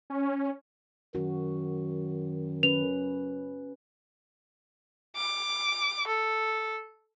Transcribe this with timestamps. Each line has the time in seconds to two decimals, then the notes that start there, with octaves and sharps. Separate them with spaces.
0.10 C#4
1.15 F#2 D#3 F#4
2.63 C#4 B4 F7
5.16 D6
6.07 A4